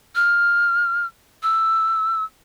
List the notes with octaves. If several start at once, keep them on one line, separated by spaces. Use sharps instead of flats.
F6
E6